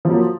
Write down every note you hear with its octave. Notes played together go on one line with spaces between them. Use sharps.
F3 F#3 A#3